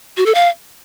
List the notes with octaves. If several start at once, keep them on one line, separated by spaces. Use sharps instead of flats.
F#4
A4
F5